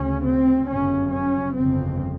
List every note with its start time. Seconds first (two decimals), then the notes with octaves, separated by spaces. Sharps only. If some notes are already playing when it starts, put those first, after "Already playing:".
Already playing: D2 C#3 C#4
0.26 C4
0.70 G1 F#2 C#3 C#4
1.14 C#4
1.57 G1 F2 C#3 C4